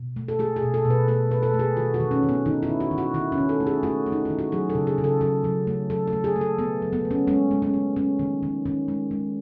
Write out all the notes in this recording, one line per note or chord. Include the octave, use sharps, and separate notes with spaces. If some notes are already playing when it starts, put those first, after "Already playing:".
Already playing: B2
A3
A4
A3 G#4
G#4
B2
A4
B2
B4
A3 A4
B2 B4
A4
A3
G#4
D#3 F#4
F#4
D#3
C#4
D#3
B3
D#3 D#4
E4
D#3
F#4
D#3
F#4
D#3 E4
C#4
D#3
A4
A3
G#4
A3 F#4
A3
D#4
D#3 E4
F#4
F#3 G#4
A4
C#3
G#4
C#3
A4
F#3 A4
F#3
A3
F#3 A4
A4
A3
G#4
A3
A4
A3 B3
F#3
B3
A3
C#4
G#3 C#4
G#3
C#4
G#3
G#3 C#4
D#3
D#3
D#3 C#4
G#3
G#3